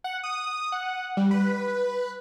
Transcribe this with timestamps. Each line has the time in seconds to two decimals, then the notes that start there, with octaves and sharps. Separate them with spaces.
0.04 F#5
0.23 D#6
0.72 F#5
1.17 G3
1.31 B4